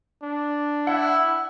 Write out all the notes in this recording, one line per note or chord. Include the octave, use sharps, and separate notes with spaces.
D4
E4 F#5